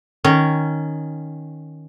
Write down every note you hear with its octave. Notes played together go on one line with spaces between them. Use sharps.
D#3 C#4